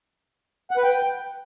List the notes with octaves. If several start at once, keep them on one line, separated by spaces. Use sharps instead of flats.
F#5
B4
G5